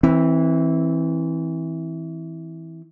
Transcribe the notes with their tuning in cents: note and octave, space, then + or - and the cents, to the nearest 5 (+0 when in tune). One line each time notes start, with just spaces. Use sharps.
E3 -15 C4 +15